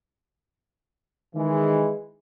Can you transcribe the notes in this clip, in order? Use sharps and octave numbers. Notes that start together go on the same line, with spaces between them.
D#3 E3 G#3